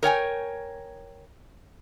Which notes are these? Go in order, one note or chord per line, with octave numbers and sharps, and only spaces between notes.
A#4 C#5 G5 G#5